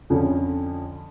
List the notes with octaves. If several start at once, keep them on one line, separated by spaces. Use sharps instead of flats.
F2 D3 F3 C#4